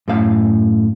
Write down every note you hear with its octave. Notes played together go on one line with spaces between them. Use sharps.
F#2 A2 F5